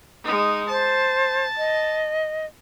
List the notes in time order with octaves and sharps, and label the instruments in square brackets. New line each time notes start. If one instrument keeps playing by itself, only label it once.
[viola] G#3 D#4
[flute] C5 [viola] A5
[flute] D#5